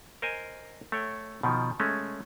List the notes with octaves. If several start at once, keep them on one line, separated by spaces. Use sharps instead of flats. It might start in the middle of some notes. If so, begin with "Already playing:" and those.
A#4 C5 D#5 G#5
A3 C#5 G5
B2 D#3 F3
G#3 A3 C#4